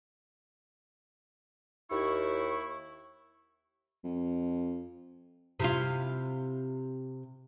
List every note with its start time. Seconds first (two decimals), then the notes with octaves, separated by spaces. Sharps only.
1.91 D#2 E4 C#6
4.04 F2
5.60 C3 E4 F4